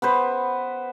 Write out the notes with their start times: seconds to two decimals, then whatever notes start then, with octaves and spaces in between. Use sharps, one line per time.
0.02 B3 B4 C5